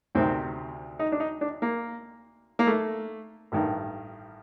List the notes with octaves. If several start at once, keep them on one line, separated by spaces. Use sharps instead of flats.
D2 C3 D#3 C4
D#4
D4
D#4
D4
A#3
A#3
A3
A1 G2 D#3